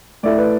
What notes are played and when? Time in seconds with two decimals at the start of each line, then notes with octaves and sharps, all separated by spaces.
0.23 A2 A3 E4 D5
0.38 B4